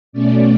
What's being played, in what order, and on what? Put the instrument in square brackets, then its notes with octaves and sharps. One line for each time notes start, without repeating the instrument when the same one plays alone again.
[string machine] B2 A3 C#4 D5